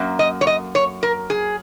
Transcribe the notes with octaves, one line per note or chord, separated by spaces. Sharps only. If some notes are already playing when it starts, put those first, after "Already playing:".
Already playing: F#2 A#3
D#5
C#5
D#5
C#5
A#4
G#4